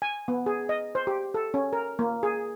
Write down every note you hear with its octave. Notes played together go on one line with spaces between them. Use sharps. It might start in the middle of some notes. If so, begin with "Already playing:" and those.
G#5
B3
G#4
D#5
C5
G4
A4
C#4
A#4
A#3
G#4